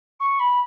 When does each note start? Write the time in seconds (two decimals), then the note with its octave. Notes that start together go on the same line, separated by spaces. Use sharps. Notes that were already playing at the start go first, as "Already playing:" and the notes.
0.19 C#6
0.39 B5